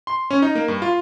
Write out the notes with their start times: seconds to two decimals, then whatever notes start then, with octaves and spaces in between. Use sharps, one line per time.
0.07 C6
0.30 C#4
0.42 D#4
0.55 A#3
0.68 G2
0.82 F4